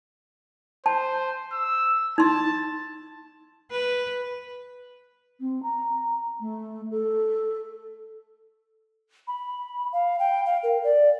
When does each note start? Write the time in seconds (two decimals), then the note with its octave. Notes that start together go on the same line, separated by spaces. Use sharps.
0.86 C5 A5
1.52 E6
2.18 D#4 A5 C6
3.71 B4
5.40 C4
5.63 A#5
6.40 A3
6.91 A4
9.27 B5
9.93 F5
10.19 G5
10.46 F5
10.63 A#4
10.84 D5